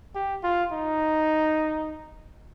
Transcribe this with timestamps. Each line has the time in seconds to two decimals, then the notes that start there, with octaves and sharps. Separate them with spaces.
0.15 G4
0.43 F4
0.72 D#4